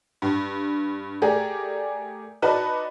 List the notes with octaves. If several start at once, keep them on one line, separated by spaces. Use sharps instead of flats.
G2
A3 G4 G#4 A#4 D5
D#4 F#4 B4 D5 A5